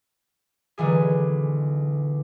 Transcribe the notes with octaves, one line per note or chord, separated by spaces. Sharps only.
B1 D3 E3 G#4